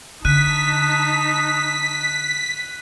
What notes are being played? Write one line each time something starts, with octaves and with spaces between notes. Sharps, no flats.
D3 D#4 A5 F#6 B6 D#7